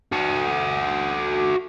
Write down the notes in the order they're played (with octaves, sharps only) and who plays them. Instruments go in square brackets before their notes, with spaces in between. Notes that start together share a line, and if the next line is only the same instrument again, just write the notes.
[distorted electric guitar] F#4 A4